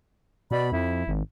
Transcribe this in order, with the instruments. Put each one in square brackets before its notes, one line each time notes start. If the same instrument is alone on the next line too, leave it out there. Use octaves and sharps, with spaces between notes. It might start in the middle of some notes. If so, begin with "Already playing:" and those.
[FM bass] B2 [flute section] D5 B5
[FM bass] F2 [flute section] E4
[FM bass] G#1